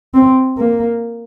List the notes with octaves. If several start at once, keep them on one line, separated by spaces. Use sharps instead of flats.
C4
A#3